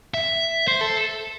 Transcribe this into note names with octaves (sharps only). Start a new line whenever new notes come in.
E5
C5
A4